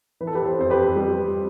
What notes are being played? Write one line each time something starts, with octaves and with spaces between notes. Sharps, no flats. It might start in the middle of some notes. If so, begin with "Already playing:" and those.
E3 B4
A4
G4 B4
A4 C5
F2 C5
G4 B4
G3